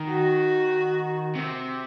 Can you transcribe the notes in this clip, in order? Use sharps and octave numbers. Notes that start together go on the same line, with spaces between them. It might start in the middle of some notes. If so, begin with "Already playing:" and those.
Already playing: D#3
F#4
C3